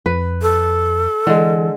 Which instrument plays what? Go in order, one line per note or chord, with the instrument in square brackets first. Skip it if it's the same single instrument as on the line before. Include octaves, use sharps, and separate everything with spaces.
[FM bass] F2 [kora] B4
[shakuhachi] A4
[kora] D3 G#3 [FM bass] E3